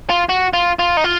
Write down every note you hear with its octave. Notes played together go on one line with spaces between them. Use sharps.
F4
F#4
F4
F4
D#4
F4